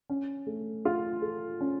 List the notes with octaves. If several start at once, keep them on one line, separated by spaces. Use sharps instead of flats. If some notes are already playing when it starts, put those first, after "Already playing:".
C#4
A3
F4
A4
C#4